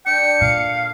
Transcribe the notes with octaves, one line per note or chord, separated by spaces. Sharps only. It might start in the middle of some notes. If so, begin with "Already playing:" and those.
D3 D4 G5 C#7
A#2 F5